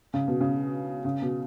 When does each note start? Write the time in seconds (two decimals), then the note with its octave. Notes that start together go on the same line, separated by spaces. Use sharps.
0.14 C#3
0.28 B2
0.41 C#3
1.05 C#3
1.22 B2